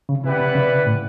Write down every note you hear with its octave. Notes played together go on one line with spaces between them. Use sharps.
C#3
C3 E4 G4 B4 D5 F#5
C3
C#3
A2